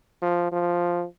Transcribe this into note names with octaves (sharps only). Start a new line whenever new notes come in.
F3
F3